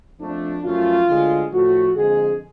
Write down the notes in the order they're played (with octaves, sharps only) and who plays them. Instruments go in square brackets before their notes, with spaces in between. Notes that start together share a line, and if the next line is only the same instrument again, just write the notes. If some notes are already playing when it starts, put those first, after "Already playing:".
[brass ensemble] F2 F3 A3 D4
F#2 F3 A3 F4
D2 D3 G#3
A2 F3 A3 F#4
F2 D3 G#3 G#4